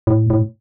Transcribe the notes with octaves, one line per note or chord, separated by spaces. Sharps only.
A2
A2